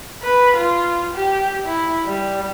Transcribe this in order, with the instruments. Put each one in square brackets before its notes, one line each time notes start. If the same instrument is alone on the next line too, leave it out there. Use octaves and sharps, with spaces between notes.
[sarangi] B4
F4
G4
E4
G3